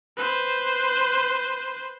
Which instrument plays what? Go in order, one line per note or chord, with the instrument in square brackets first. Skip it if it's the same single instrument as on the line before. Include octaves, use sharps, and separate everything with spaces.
[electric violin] B4 C5